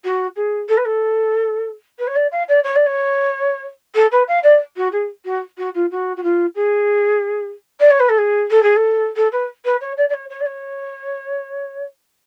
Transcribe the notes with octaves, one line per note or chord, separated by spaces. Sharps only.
F#4
G#4
A4
B4
A4
B4
C#5
D5
F5
D5
C#5
D5
C#5
A4
B4
F5
D5
F#4
G#4
F#4
F#4
F4
F#4
F#4
F4
G#4
D5
C#5
B4
A4
G#4
A4
G#4
A4
A4
B4
B4
C#5
D5
D5
C#5
C#5
D5
C#5